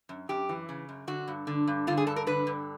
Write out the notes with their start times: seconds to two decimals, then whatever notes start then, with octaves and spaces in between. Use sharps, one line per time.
0.09 F#2
0.29 F#2 G4
0.49 E3
0.69 C#3
0.89 F#2
1.08 D3 F#4
1.28 G2
1.47 D3
1.67 G2
1.87 D3 F4
1.97 G#4
2.07 G2 A4
2.16 A#4
2.27 D3 B4
2.47 G2